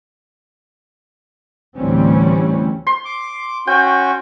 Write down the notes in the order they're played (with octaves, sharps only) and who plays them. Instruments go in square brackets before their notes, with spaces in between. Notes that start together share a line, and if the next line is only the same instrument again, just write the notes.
[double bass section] D2 A2 E3 G3 C4 C#4
[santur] C6
[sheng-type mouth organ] D6
[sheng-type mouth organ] C#4 F#4 [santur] G5